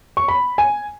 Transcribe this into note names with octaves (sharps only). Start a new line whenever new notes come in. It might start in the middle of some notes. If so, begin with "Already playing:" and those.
C#6
B5
G#5